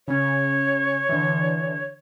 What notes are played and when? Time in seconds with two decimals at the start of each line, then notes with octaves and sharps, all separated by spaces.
0.08 C#3 C#4 C#5
1.09 D3 E3